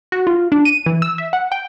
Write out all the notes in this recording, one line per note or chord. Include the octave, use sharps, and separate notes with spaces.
F#4
F4
D4
D#7
E3
E6
E5
F#5
G5